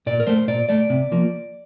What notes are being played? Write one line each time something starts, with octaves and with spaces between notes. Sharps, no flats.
A#2 D5
A#4
A3 C5
A#2 D5
A3 D5
C3
F3 A#3